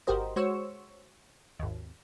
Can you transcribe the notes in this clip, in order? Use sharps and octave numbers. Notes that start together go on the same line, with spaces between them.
G1 F#4 G4 A#4 C5 D#5
G#3 F#4 C5 C#5 C#6 E6
G#1 D#2